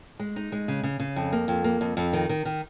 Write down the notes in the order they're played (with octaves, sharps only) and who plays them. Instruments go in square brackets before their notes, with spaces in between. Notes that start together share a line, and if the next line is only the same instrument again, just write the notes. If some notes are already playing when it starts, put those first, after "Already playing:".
[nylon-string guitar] G#3
D#4
G#3
C#3
C#3
C#3
F2
A#3
F2
A#3
F2
F2
D#3
D#3
D#3